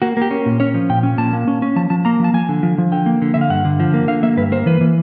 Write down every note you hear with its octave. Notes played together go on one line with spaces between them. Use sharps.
A#3 F#4
A#3 G4
C#4
A#2
C#4 C#5
F3
A#2 G5
C#4
A#2 A5
A#3
C#4
C#4
F3 A5
F3 A5
A#3 A#5
F3 A5
F3 G#5
D3
F3
F3
D3 G5
A#3
D3
D3 E5
F5
G2 F#5
D3
F3
A#3
D3 F5
A#3 E5
G2 B4
A#3 C5
E3 B4
E3